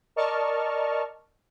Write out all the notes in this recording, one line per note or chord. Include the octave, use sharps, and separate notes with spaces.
A#4 D5 D#5 A5 C#6 F6